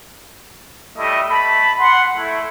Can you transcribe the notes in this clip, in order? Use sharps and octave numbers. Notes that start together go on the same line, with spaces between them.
G3 A3 E4 D#5
A3 A5 B5
F#5 C6
A3 E4